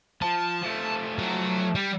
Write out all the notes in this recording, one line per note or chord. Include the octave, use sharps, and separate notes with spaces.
F3 A5
F3 A3
F#3
G3